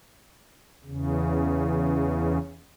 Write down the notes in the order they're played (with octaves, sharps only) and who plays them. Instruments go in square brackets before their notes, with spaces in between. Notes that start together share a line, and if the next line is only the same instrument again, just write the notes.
[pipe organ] E2 C#3